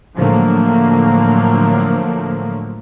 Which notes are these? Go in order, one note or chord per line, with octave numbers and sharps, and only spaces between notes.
A2 D3 F3 F#3 A3 A#3